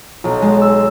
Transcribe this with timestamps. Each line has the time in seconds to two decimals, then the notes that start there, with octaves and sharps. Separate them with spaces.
0.24 B1
0.42 G#3
0.62 E6